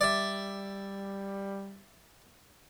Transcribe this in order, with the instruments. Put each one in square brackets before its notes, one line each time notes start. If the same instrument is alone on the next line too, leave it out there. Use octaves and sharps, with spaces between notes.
[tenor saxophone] G3 [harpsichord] D5 E5